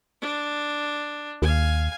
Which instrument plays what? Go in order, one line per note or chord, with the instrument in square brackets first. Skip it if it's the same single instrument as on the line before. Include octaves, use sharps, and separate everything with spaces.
[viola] D4
[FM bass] D#2 [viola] F5 G#5